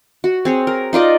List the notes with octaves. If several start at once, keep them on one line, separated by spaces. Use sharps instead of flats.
F#4
C4 G#4 C#5
A#4
D#4 F4 D5 D#5